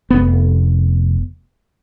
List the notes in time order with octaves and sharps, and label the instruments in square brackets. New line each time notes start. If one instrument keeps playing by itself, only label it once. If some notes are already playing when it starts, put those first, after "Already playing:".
[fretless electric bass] F1 B3